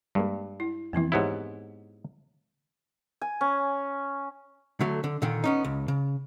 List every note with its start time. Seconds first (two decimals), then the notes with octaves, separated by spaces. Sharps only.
0.15 G2 G3 G#3 A#3
0.60 E4
0.93 F2 B2 E3 A#3 C4 E4
1.12 G#2 B3 E4 G4 C#5
3.21 G#5
3.41 C#4
4.80 D3 F#3 A3
5.04 D3
5.22 A#2 D3 D#3
5.44 B3 C#4 D#4
5.64 C#2
5.88 C#3